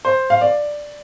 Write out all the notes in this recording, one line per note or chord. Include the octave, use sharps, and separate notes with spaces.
C5
F5
D5